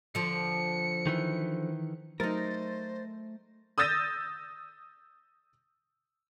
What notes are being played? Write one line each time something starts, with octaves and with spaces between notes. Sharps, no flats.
D3 F3 C#7
D#3 E3
F#3 A3 D#4 A#4 C5 A6 A#6
D#6 E6 G6 A6 A#6 D#7